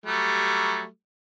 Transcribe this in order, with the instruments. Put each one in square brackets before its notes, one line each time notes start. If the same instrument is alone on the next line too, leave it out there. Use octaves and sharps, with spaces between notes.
[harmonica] F#3 G3 A3